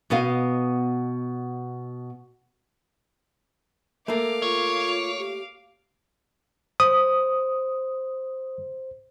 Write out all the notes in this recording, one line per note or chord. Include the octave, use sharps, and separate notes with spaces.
B2 B3 D#5 F5
A3 A#3 F5 D6
F4 C#5
G4
C5 D#6